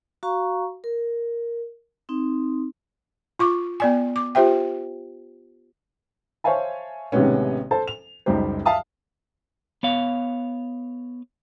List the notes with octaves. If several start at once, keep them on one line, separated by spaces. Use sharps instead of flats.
F#4 F5 A#5 C#6
A#4
C4 D#4
F4 C#6 D6
B3 D5 G#5
D6
F4 G4 C5 E5 G5
C5 C#5 E5 F5 G#5 A5
A1 C3 D#3 G#3 B3 C#4
A4 C5 A5
F7
C#2 F#2 G3 D#4 G4 C5
E5 F5 A5 D#6
B3 C#5 F5